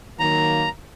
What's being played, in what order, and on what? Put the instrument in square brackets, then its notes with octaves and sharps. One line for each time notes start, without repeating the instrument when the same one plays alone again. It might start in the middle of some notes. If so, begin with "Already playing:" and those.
[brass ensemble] D#3 F#3 A#3 [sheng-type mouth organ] A#5